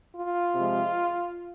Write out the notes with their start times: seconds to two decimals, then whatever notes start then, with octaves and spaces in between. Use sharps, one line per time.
0.15 F4
0.54 C3 F3 G#3